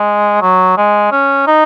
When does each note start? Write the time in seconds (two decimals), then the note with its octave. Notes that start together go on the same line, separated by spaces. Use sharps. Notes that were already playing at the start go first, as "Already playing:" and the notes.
Already playing: G#3
0.42 F#3
0.78 G#3
1.12 C#4
1.47 D#4